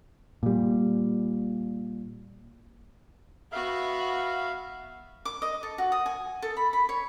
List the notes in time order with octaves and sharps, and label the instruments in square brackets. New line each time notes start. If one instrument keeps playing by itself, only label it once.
[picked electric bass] A#2 G3
[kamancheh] B3 F#4 [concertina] E5 F5
[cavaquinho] D6
D#5
A4
F#4
D#6
G#5
A4
B5
B5
C#5